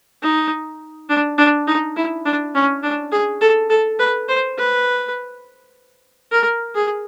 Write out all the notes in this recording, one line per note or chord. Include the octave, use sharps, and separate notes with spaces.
D#4
D4
D4
D#4
E4
D4
C#4
D4
G#4
A4
A4
B4
C5
B4
A#4
G#4